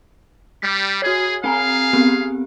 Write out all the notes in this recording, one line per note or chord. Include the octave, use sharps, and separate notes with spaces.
G3 B6
F#4 G#4 C#5
C4 G#4 F5 G#5 A#5
B3 C4 G4